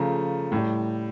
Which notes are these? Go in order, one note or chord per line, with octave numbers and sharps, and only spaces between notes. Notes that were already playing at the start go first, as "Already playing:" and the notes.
Already playing: C#3 F3 A3 A#5
A2 G3